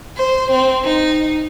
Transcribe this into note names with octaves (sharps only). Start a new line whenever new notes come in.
C5
C4
D#4